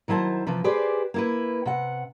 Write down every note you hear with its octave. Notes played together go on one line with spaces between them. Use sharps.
D#3 F#3 E4 C5 A5
C3 E3 F3
G4 G#4 B4 C5 D5
A#3 E4 B4
C3 F#5